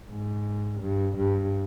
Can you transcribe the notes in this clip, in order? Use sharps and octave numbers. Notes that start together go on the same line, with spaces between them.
G#2
G2
G2